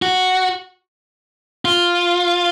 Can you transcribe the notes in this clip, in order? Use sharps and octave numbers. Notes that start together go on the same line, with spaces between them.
F#4
F4